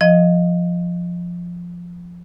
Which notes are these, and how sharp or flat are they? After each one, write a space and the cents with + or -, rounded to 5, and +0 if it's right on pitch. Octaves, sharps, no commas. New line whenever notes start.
F3 +0 D#5 +0